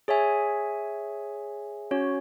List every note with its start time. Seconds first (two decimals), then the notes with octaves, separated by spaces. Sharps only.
0.08 G#4 C#5 E5 G#5
1.91 C#4 F#4 C#5